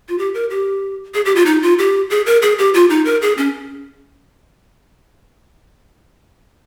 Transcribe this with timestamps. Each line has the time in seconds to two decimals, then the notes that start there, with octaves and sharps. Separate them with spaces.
0.09 F4
0.18 G4
0.34 A#4
0.50 G4
1.14 G#4
1.25 G4
1.36 F4
1.46 D#4
1.62 F4
1.79 G4
2.10 G#4
2.26 A#4
2.42 G#4
2.58 G4
2.74 F4
2.90 D#4
3.05 A#4
3.22 G#4
3.38 C#4